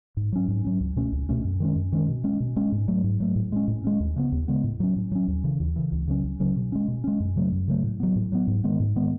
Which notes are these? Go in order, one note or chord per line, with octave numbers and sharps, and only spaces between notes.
G#2
F#3 C#4
G#2
F#3 C#4
C#2
B2 A3 C#4
C#2
B2 A3 C#4
F#2
D#3 G#3 C#4
F#2
D#3 G#3 C#4
B2
G#3 C#4
B2
G#3 C#4
G#2
F#3 A3
G#2
F#3 A3
A2
G#3 C#4
A2
G#3 C#4
D#2
C#3 G#3 B3
D#2
C#3 G#3 B3
A2
F#3 C#4
A2
F#3 C#4
D#2
C#3 E3
D#2
C#3 E3
C#2
C#3 F#3 C#4
C#2
C#3 F#3 C#4
B2
G#3 C#4
B2
G#3 C#4
F#2
C#3 F#3 A3
F#2
C#3 F#3 A3
A2
F#3 B3
A2
F#3 B3
G#2
D#3 G#3 B3
G#2
D#3 G#3 B3